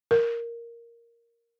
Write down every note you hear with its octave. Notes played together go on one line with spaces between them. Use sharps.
A#4